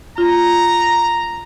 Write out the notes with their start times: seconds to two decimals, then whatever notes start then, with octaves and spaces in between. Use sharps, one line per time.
0.18 F4 A#5